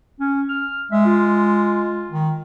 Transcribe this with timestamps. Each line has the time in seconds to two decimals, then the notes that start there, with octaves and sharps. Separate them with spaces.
0.20 C#4
0.49 F6
0.92 G#3 E5
1.06 F4
2.11 D#3